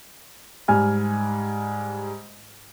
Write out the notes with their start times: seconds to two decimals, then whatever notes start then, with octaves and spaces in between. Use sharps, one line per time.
0.68 G#2 G3 G#5 F6